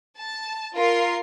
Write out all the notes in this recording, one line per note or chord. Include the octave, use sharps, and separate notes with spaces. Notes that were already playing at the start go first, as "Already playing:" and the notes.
A5
F4 A#4 C7